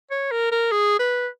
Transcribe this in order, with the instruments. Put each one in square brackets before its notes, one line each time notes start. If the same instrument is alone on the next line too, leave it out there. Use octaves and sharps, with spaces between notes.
[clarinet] C#5
A#4
A#4
G#4
B4